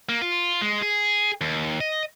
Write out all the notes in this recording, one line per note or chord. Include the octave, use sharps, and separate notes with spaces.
A#3
F4
G#3
G#4
D#2
D#5